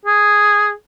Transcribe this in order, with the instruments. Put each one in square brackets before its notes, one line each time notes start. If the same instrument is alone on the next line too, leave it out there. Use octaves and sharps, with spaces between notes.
[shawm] G#4